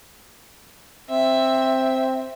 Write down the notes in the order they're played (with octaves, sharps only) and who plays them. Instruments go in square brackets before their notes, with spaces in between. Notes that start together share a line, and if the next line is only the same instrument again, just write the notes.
[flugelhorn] C4 [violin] E5